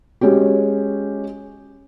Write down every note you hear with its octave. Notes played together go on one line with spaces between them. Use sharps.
G#3 C#4 F#4 G4